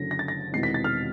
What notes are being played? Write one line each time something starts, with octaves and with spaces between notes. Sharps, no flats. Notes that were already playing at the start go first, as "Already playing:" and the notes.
Already playing: F#1 F#2 D3 A#6
A#6
A6
A#6
E1 E2 C3 D#3 C7
B6
A6
F6